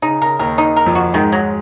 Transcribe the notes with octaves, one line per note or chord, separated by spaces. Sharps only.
C#3 D#4
C#3 A#4
D#2 D#3 A#4
D#4
A#4
F2 F3
F#4
G#2 D#3 G#3
F#3